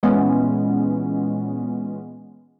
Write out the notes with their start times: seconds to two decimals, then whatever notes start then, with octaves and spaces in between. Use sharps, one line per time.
0.03 A#2 E3 G#3 B3 C#4